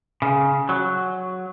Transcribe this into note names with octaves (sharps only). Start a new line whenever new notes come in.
C#3
F#3